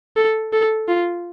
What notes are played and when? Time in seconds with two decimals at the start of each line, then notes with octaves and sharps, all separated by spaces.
0.16 A4
0.53 A4
0.88 F4